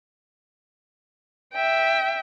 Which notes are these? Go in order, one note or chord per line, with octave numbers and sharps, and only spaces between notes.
E5 G5